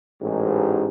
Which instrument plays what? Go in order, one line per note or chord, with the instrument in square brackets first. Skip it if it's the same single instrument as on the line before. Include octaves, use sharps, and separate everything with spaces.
[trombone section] A1 G#2